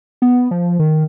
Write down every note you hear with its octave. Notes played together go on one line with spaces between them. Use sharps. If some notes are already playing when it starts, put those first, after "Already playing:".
B3
F3
D#3